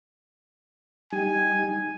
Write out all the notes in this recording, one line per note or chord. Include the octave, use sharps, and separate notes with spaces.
G3 D#4 G4 G5 G#5